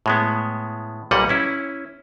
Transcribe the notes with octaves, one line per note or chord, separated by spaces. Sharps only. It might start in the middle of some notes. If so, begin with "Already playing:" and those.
A2 G#3 B3
B1 A#2 G3 A#3 D#5 F#5
C#4 E4